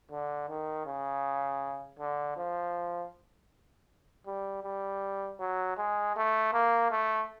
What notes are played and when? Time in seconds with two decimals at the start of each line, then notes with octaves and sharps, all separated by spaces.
0.11 D3
0.49 D#3
0.86 C#3
1.99 D3
2.37 F3
4.27 G3
4.64 G3
5.40 F#3
5.78 G#3
6.16 A3
6.53 A#3
6.91 A3